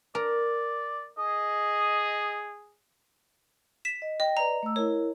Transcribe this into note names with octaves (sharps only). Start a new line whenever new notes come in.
A#4 D5
G#4 D#5
B6 E7
D#5
D#5 G5
B4 D5 A#5
A3 E6
E4 A#4 C#5